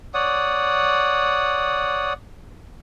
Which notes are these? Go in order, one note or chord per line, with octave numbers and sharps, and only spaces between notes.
C#5 D5 F#5 D#6